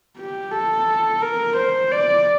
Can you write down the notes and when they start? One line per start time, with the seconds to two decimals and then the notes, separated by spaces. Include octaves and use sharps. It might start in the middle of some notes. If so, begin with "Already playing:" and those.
0.17 G4
0.52 A4
1.22 A#4
1.57 C5
1.91 D5